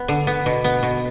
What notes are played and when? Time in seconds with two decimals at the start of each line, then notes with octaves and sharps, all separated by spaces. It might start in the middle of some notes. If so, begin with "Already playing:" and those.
Already playing: B3
0.08 D3
0.27 B3
0.46 B2
0.64 B3
0.83 B2